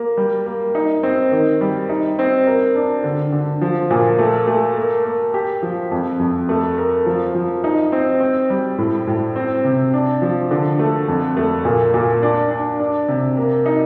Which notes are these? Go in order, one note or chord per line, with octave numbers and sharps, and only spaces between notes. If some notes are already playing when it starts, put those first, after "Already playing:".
Already playing: A#3
G3
A#3
D#4
C4
D#3
G3
D#4
C4
A#4
D4
D3
D3
F3
A#2
A3
A3
A#3
A#3
G4
F3
F2
F2
A3
A#4
F3
F3
D#4
C4
C4
G3
A2
A2
C4
C3
D4
F3
D3
A3
F2
A3
A#2
A#2
D4
D4
D4
C3
A#3
D#4